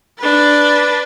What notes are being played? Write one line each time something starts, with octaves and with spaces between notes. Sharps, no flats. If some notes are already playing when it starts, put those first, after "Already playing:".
D4 B4